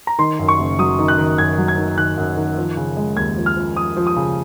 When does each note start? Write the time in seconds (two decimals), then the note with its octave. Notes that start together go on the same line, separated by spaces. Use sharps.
0.07 A#5
0.18 D#3 C6
0.39 F#2
0.48 C#6
0.59 F#1
0.79 F#3 D#6
0.99 D#3
1.08 F#6
1.18 D#3
1.38 F#2 G#6
1.58 F#3
1.68 G#6
1.77 D#3
1.97 D#3 F#6
2.17 F#2
2.37 D#3
2.57 F3
2.77 C#3
2.97 G#3
3.17 D#2 G#6
3.37 F3
3.46 F6
3.56 F3
3.76 F3 D#6
3.97 F3
4.07 D#6
4.16 C#3